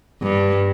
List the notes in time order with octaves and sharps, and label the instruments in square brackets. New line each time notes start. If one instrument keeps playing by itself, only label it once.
[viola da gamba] G2